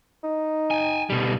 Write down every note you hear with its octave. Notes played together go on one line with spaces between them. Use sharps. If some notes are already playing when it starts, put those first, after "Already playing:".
D#4
G5 G#5
B2 G3